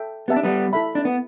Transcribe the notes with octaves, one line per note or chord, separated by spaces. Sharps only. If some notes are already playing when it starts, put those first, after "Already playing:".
Already playing: A4 E5 G5
B3 G4 E5 A5
D4
G3 B3
E4 A4 E5 B5
D4
B3